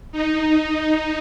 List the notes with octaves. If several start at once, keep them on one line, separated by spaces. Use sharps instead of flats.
D#4